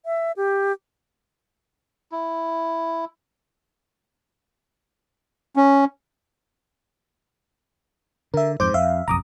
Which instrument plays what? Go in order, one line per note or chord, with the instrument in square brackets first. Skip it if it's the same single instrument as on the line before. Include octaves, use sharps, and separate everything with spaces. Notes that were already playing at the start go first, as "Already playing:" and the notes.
[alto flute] E5
G4
[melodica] E4
[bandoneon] C#4
[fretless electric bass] D3 [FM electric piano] A#4 E5
[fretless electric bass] F2 G#2 [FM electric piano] C5 D6 G6
[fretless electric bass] F2 [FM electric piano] E5 F5
[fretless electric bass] F#1 B1 F2 [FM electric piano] A#5 D6 D#6